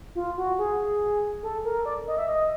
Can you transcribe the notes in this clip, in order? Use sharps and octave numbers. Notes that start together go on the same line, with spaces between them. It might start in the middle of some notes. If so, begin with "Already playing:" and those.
F4
F#4
G#4
A4
A#4
D5
D#5
E5
D#5